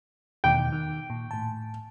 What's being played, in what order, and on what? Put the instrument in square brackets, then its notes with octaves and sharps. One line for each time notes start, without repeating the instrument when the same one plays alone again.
[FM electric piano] E2 B2 D#3 [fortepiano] G5
[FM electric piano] D#3
A#2
A2 A5